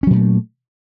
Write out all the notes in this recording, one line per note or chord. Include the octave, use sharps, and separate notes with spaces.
A#2 F#3 A3 C#4